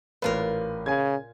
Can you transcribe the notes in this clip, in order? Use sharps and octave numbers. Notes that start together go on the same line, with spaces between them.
A1 A#2 F4 A#4 B4
C#3 G#5 G#6